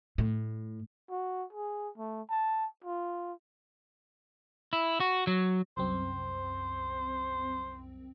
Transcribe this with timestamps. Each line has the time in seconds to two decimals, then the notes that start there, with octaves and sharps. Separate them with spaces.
0.18 A2
1.10 F#4
1.53 G#4
1.98 A3
2.30 A5
2.84 F4
4.73 E4
5.00 F#4
5.27 F#3
5.77 C2 F#2 C4 C5